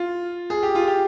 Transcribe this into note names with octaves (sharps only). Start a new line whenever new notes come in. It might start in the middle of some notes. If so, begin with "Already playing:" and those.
Already playing: F4
G#4
G4
F4
G4